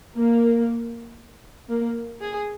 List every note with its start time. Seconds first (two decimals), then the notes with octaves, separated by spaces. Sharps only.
0.16 A#3
1.69 A#3
2.21 G#4